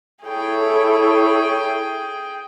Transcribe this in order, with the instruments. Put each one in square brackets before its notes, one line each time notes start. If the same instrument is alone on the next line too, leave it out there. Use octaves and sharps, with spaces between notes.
[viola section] E4 A4 C#5 [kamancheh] G#4 G5